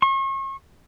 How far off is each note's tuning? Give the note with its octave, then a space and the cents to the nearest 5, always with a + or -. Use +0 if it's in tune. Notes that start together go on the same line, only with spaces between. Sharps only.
C#6 -40